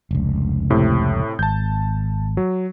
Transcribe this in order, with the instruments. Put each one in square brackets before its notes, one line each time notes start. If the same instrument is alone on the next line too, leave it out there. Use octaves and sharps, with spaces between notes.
[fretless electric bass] F1 C#2
[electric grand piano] A2 C3 C4
[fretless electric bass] G#1 [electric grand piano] A5 G6
[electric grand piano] F#3